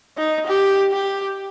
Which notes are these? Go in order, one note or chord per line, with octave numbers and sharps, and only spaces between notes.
D#4
G4
G4